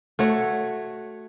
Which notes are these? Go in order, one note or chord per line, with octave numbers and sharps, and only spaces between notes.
A3 F#4 C#5